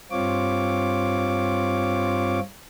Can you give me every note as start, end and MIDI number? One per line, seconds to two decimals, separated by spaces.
0.11 2.39 43
0.11 2.39 60
0.11 2.39 65
0.11 2.39 73
0.11 2.39 86